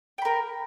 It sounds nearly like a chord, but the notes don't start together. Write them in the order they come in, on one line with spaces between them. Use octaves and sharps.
G5 B5 A#4